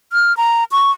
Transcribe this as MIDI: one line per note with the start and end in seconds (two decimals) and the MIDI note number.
0.13 0.35 89
0.37 0.64 82
0.72 0.91 85